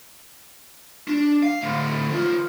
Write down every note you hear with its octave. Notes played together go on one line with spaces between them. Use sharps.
D4
F5
D2 A2
D#3 F4